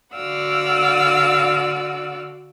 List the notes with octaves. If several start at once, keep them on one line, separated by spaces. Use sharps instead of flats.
D3 F#4 D5 F5 F#5 E6